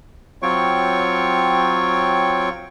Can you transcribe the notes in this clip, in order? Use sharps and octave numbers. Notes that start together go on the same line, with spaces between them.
F#3 C4 F4 C#5 G5 C#6